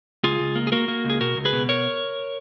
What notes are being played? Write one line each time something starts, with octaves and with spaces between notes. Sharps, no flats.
C#2 F4 G#4
C#2
A#3
G#4
A#3 F#4 A#4
A#3
C#2
G#4
B2 F#4 A#4
C#2
G#4 B4
B2
A#4 C#5